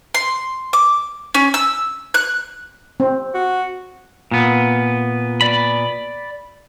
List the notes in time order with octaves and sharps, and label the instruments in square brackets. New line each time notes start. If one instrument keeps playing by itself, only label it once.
[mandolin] C6
D6
C#4
E6
F#6
[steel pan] C4
[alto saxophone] F#4
[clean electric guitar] A#2 B3
[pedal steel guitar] D5 B5